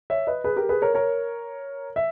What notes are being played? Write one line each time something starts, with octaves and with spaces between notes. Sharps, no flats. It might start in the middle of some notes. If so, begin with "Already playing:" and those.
C#5 E5
B4 D#5
G#4 B4
G4 A#4
G#4 B4
A#4 C#5
A#4 C#5
E5